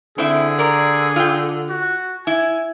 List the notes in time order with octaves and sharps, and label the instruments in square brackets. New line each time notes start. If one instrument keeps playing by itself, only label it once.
[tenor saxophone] D3 [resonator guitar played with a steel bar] C4 E4 [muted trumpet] G#4
[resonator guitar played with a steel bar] A#4 D5
F4 G5
[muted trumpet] F#4
[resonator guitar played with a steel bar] E4 [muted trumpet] G#5